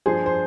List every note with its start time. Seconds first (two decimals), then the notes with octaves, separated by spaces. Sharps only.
0.06 G2 F3 G#4 C5
0.26 G#4 C5